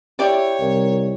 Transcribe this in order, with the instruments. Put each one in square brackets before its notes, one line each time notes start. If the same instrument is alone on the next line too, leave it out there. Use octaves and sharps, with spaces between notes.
[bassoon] E4 [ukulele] G4 D5 [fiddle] C#5
[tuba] C2 [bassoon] D#3